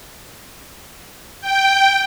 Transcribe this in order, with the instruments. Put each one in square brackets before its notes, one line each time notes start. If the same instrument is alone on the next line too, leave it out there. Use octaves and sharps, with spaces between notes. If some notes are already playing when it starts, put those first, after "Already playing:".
[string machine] G5